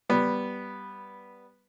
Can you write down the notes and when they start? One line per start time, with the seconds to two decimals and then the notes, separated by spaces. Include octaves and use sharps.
0.09 G3 B3